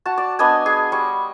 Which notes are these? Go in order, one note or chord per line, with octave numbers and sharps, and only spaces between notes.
F#4 A5
D5
B3 D4 D#5 G#5
G#4
G3 C#6